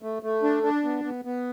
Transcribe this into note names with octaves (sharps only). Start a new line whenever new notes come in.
A3
A3
D4
D4
B3
B3
B3